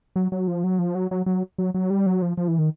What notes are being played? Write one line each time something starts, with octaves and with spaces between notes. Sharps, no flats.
F#3
F#3
F3
F#3
F3
F#3
F#3
F#3
F#3
F#3
G3
F#3
F3
F3
E3
D#3